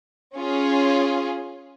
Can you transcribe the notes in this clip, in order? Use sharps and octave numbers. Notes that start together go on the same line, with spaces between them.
C#4 F4 G#4